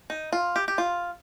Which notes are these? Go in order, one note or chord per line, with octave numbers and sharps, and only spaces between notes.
D#4
F4
G4
G4
F4